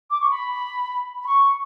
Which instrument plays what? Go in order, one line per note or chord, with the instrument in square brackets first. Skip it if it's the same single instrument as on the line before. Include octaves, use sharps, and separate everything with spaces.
[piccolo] D6
C#6
B5
B5
C#6